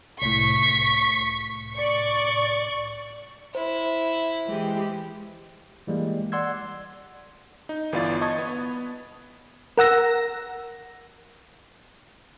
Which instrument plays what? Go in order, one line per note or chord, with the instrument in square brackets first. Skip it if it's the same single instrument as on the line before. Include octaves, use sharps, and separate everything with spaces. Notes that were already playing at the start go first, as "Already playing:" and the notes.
[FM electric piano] C2 A2 [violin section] C#6 B6
[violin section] D5 C#6
[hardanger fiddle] E4 [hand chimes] C5
[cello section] E3 G#3 G4
[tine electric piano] E3 G3 G#3 A#3
D5 F#5 C6 E6 G#6
[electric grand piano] D#4
G1 E3 B3 F4 D5 A6
D#5 A5 C#6 D#6 G#6
B3
[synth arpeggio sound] A#4 F#5 E6 A#6